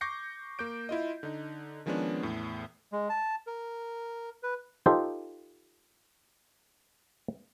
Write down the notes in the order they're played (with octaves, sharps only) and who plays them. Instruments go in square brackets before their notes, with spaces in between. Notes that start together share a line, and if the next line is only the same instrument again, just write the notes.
[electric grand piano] C#6 D6 G6 A#6 C7 C#7
A#3 D6 G6 D7
E4 F4 D#5
D3 D#4
D#3 F3 G#3 B3 C#4 D4
E2 A2
[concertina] G#3
A5
A#4
B4
[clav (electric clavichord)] D#4 F4 G4 A4 C5